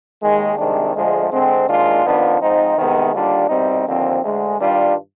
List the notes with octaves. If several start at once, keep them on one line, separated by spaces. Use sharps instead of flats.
D#2 D#3 G#3
C2 C3 D#3 G#3 D4
D2 D3 F3 G#3
D3 G#3 C4
D#2 D#3 G#3 D4 F4
F2 D#3 B3 D4 F4
G#2 F3 C4 D#4
C2 C3 D#3 G#3 B3
D#2 D3 G3 D4 F4
C2 B2 G3 C4 D#4
D#2 D3 F3 C4
D2 D3 G#3
G2 D#3 G3 D4 F4